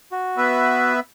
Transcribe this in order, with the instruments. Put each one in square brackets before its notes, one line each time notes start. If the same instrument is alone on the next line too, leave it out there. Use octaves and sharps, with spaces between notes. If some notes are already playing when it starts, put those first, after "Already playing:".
[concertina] F#4
[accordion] B3 B4 E5